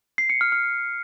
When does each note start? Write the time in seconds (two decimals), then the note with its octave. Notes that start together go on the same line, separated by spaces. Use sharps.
0.18 C7
0.30 C#7
0.41 F6
0.52 F6